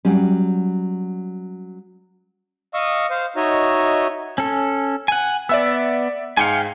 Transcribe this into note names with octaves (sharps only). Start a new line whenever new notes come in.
F#3 G3 C#4
D#5 F5 C#6 D#6 E6
C5 F5
D#4 F#4 C#5 D#5 E5
C#4 A4
F#5 G#5
B3 D5 E5 E6
G#2 F5 G5 G#5 C#7